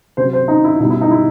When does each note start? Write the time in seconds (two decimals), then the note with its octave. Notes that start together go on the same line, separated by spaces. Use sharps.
0.17 C3 F#3 C5
0.33 C5
0.48 D#4
0.64 E4
0.80 B2 D#4
0.83 G3
0.90 E4
1.01 D#4
1.11 E4